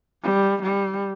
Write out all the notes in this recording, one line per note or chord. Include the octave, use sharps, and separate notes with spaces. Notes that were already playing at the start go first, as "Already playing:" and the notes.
G3
G3